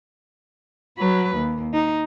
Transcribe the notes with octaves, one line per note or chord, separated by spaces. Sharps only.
F#3 B4
D#2
D#4